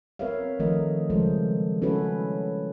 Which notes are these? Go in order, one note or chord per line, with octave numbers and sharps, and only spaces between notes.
C4 A#4 B4 C#5 E5 F5
D#3 F3 A3 A#4 D#5
C#3 F3 G3 G#3 A4 C5
C#4 E4 F#4 A4 B4 C#5